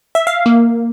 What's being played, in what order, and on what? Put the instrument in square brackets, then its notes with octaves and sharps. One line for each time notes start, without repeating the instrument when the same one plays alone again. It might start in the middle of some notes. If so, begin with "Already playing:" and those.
[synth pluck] E5
F5
A#3